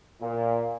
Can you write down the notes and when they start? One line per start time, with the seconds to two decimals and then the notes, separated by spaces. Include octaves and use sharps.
0.21 A#2